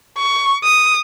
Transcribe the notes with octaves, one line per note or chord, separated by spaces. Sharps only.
C#6
D#6